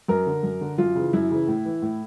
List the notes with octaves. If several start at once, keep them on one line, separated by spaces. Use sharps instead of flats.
F#2 A#4
D3
F#2
D3
F#2 F4
C#3 E3
F#2 E4
C#3 E3
A2
E3
A2